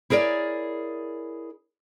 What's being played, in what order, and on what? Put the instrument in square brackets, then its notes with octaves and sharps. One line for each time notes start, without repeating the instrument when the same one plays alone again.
[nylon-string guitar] E4 G#4 A#4 C#5 D5